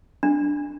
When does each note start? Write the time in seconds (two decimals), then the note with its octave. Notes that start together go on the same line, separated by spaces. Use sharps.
0.23 D4